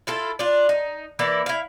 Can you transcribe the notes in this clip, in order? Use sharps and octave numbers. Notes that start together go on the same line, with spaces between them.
E4 F4 A4
D4 F4
D#4
E3 A#3 E4 D5
E4 F5